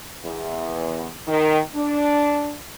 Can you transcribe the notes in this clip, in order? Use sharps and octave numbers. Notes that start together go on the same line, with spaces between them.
E2
D#3
D4